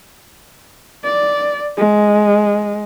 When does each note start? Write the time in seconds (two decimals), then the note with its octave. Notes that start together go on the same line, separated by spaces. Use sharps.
1.04 D5
1.77 G#3